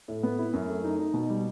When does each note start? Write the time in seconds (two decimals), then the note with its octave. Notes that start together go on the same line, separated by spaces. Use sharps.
0.08 A2
0.23 B3
0.39 E4
0.53 F#2
0.68 A3
0.84 D#4
0.99 D#4
1.14 B2
1.30 G3